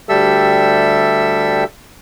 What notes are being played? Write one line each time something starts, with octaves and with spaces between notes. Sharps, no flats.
D2 G3 G4 A4 E5 E6